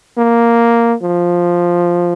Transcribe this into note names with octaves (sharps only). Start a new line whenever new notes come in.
A#3
F3